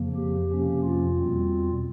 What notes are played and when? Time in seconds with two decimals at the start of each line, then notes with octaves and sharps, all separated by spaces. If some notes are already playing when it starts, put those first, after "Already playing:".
Already playing: F2 C#3 F3 A#3
0.16 G4
0.49 F2 C3 F3 A#3 C#4 G4
0.83 F4
1.17 E2 B2 G3 C4